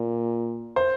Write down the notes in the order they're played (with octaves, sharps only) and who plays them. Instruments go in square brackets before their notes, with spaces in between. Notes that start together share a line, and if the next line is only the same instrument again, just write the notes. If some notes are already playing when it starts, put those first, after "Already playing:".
Already playing: [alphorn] A#2
[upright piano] C5